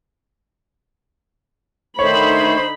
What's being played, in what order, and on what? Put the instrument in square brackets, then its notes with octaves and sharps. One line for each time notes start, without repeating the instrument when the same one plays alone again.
[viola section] D3 D#4 B5 [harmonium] D#3 A3 [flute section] C5 [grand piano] C#5